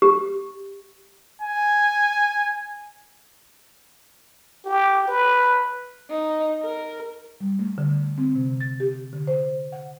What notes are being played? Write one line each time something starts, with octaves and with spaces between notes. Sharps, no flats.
G4
G#5
G4
B4
D#4
A#4
G3
A3
D3
C4
C3
A6
G4
D3
C5
F#5